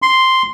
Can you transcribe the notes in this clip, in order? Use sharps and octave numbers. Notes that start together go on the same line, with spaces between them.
C6